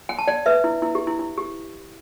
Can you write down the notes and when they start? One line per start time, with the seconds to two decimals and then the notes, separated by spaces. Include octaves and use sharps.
0.09 G5
0.19 A5
0.27 D5 G5
0.46 B4 E5
0.64 E4
0.82 E4
0.95 G4
1.07 E4
1.19 E4
1.38 G4